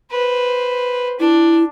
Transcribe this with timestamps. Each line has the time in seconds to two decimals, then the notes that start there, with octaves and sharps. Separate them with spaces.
0.11 B4 C5
1.20 D4 E4